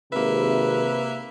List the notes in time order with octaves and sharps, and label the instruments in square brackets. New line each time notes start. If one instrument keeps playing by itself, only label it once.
[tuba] G#1 [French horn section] C3 [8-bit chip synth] A#3 E5 [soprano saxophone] B4